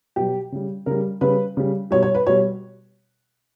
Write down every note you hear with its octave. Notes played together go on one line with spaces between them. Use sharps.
B2 F#3 G4
C#3 G3
C#3 G3 A#4
C#3 G3 B4
C#3 G3
B2 G3 C#5
C#5
B4
B2 G3 C#5